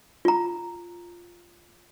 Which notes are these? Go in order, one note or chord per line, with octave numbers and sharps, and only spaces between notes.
F4 A#5